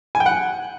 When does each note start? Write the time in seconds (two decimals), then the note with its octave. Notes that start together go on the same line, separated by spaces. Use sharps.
0.15 G#5
0.20 G5
0.26 F#5